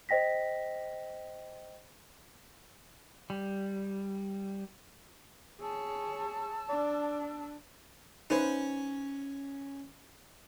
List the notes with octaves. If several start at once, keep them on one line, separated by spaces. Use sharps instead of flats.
C5 D#5 G5 A#6 B6
G3
G#4 C#5 A5 E6
D4 D5
C#4 D#4 B4 C5